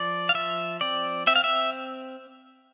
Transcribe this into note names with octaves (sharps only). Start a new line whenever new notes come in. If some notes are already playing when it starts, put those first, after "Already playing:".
Already playing: F3 D5
F5
F3 E5
C4 D5
C4 E5
F5
E5